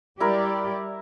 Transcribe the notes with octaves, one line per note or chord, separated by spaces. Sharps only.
G3 E4 G4 A#4 D5